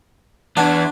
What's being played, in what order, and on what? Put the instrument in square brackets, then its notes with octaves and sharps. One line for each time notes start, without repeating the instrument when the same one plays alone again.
[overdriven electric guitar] E2 B3 [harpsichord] D4